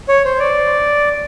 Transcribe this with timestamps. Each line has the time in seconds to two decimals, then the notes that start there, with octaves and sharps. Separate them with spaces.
0.09 C#5
0.25 C5
0.40 D5